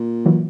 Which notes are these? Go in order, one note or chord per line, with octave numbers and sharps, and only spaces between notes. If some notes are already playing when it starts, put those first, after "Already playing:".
Already playing: A#2
E3 F#3